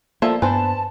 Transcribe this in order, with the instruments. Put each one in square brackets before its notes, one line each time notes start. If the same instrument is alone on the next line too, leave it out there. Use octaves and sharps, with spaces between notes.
[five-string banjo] F3 A4 E5 [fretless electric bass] A#3 [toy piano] D5
[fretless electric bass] G2 B3 [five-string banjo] B4 C5 [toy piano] G#5 [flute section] A5